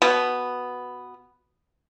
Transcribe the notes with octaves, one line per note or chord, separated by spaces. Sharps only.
B2 B3